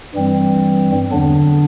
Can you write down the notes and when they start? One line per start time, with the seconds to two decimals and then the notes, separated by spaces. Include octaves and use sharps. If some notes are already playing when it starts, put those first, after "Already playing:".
0.15 G2 E3 G3 C4
1.11 E2 D3 F#3 B3 D4